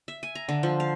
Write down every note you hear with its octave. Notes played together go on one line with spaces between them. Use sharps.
E5
G#5
A#5
D3
F3
F5